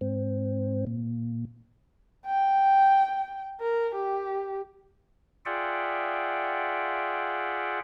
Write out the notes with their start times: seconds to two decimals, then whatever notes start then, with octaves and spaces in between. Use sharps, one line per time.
0.01 G#2 C4
0.87 A#2
2.26 G5
3.61 A#4
3.95 G4
5.46 F4 G#4 D5 E5 F#5 G5